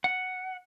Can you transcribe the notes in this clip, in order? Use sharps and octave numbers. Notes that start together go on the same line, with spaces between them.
F#5